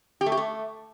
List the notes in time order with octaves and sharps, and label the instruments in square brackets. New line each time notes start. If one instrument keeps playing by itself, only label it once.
[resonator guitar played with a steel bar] G4
A3
G4
A3